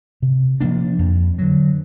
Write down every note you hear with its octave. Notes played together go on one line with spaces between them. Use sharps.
C3
F3 A#3 D4
F2
D3 F#3